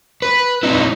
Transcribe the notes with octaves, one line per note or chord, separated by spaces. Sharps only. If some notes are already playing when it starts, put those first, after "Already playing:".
B4
C4 D#4 E4